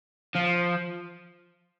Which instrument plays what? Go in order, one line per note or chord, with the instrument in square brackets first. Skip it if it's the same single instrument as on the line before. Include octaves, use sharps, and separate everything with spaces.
[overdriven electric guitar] F3